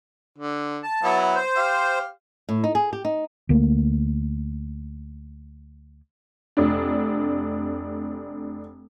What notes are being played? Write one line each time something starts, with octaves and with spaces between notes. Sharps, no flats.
D3
A5
F#3 B3 E4
C5
G4 F5
A2
D#4
G#4
G4
D#4
D2 A3 A#3
F1 D4